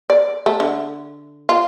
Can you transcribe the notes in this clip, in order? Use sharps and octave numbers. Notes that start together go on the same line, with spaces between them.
D5
A3
D3
F4